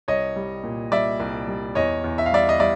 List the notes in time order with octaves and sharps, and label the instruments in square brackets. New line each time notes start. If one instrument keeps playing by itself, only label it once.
[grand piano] C2 C#5 D#5
G3
A#2
G3 D5 E5
C2
G3
E2 C#5 D#5
E2
E5
F5
G3 D5 E5
D#5
G3 D5 E5